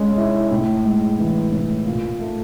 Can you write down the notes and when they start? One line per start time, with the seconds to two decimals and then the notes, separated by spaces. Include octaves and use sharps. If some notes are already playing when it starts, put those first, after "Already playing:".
Already playing: G#3 C#4
0.17 E4
0.51 A2
0.85 G#3
1.19 E3
1.52 A2
1.86 A#2
2.20 A3